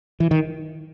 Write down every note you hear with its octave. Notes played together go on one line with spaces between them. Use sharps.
E3
D#3